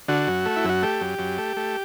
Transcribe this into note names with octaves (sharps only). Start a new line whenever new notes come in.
D3 F#4
F#2
A3
E4
F#2 F#4
A3 G4
F#2
F#2
A3
A3